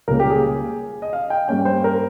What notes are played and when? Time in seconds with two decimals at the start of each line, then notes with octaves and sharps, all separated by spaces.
0.08 C#2 C#3 G3 A#3 C#4 A#4
0.20 G4
0.30 G#4
1.02 D#5
1.13 F5
1.30 G5
1.48 G2 G3 A#3 C#4 G5
1.65 C5
1.84 A#4